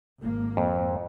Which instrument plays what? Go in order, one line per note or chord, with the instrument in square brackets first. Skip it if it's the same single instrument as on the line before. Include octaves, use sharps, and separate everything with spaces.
[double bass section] G#1 A#3
[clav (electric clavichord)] F2